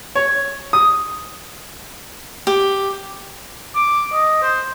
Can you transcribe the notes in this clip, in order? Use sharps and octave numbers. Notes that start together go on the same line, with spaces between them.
C#5
D#6
G4
D6
D#5
C5